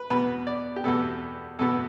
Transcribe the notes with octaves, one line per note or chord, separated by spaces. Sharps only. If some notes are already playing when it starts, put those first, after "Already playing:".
Already playing: B4
E2 B2 B3 B4
D5
G4
E2 B2 B3 A4
E2 B2 B3 A4